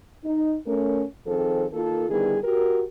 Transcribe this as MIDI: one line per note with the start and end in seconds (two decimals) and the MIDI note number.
0.25 0.54 63
0.66 1.02 57
0.66 1.02 61
0.66 1.02 70
1.26 1.64 51
1.26 1.64 53
1.26 1.64 60
1.26 1.64 68
1.26 1.64 69
1.72 2.08 51
1.72 2.08 58
1.72 2.08 65
1.72 2.08 69
2.09 2.37 50
2.09 2.37 51
2.09 2.37 55
2.09 2.37 59
2.09 2.37 64
2.09 2.37 68
2.44 2.82 66
2.44 2.82 67
2.44 2.82 70